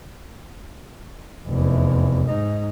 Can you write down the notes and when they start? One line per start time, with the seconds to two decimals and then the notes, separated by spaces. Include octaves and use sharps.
1.47 F1 E2
2.27 G#2 D#4